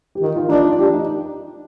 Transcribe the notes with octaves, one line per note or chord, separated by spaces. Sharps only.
G4
D#3 F4
F4
D4 D#4
F4
D4 G4
D#4